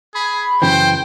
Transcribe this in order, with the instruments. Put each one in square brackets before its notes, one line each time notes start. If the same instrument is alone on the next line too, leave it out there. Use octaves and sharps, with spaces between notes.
[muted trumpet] G#4 [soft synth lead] B5
[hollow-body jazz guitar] F#2 C#3 E3 [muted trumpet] C5 [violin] G5